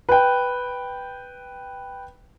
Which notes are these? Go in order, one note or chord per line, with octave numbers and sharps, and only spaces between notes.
B4 G5